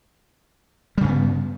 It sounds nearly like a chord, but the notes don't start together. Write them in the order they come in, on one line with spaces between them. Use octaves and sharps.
G3 C#3 G2 B3